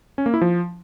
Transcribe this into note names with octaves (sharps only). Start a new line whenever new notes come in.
C#4
A#3
E4
F3